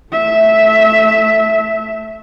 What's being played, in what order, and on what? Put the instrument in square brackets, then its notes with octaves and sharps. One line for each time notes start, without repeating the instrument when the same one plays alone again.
[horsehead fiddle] A3 E5